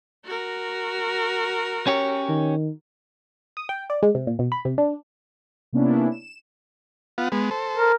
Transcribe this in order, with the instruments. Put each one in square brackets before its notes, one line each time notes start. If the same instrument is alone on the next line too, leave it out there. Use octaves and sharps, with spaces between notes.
[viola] F#4 A#4
[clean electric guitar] C#4 G4 C#5
[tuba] D#3
[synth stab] D#6
G5
D5
G#3
C3
A#2
B2
B5
C3
D4
[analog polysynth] C3 A#3 B3 C#4 D4 E4
E7
[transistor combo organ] B3 F4 F#5
G#3 B3
A4 C5
[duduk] A#4